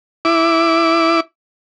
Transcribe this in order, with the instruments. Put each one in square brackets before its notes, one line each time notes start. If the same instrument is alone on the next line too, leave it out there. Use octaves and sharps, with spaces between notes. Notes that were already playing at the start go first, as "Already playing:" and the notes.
[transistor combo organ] E4 D6